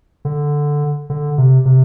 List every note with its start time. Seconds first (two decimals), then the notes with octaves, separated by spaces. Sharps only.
0.25 D3
1.10 D3
1.38 C3
1.66 C3